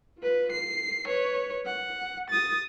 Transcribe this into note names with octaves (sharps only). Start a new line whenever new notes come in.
F4 B4
C7
B4 C#5
F#5
D#6 A6